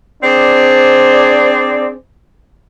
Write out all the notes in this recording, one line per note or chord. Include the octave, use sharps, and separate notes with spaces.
C4 D4 G#4 C5 D5